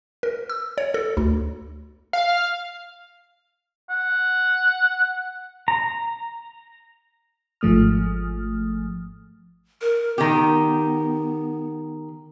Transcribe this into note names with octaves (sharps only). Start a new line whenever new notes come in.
A#4
E6
C#5
A4
D2
F5
F#5
A#5
G#1 G#2 F3 A3 D#6 F6
A#4
D#3 B3 G4